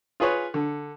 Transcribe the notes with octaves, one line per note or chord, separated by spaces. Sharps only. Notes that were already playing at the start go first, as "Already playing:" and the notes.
F4 G#4 B4 C#5
D3